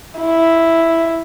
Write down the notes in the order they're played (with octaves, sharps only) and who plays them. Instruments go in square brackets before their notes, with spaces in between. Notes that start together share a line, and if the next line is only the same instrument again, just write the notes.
[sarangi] E4